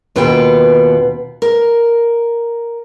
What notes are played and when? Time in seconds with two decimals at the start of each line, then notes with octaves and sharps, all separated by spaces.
0.16 D#2 B2 B3 F4 G5
1.42 A#4